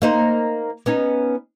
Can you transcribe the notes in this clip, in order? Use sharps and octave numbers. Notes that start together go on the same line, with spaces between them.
A#3 D#4 C5
B3 C#4 D#4